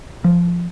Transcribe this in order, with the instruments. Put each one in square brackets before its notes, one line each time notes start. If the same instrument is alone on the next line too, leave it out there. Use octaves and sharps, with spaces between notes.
[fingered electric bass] F3